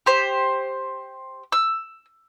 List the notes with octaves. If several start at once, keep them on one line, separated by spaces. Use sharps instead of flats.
G4 C5
E6